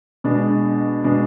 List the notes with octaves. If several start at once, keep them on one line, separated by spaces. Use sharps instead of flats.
B2 G#3 D4
B2 G#3 D4